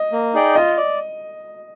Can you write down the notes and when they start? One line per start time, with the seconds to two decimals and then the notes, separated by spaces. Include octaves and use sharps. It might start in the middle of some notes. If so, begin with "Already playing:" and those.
Already playing: D#5
0.12 A#3
0.34 D#4 G#4 D5 G5
0.56 F4 D#5
0.77 D5